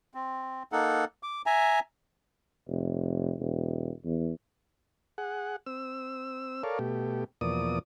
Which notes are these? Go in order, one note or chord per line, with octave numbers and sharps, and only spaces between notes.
C4
A#3 D#4 A4 F#5
D6
E5 G#5 A#5
F1
E1
E2
G#4 F#5
C4 E6
A4 A#4 C#5 D5 F5
B2 A3 G4
E2 B2 F3 A#3 D5 D#6